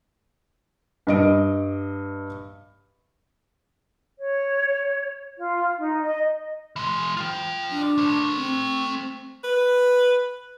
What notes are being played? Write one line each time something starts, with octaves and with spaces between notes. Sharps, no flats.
G2 D#5 D7
C#5
F4
D#4
D#5
E3 G#3
F4 G5
D4
A3 C5
C4
B4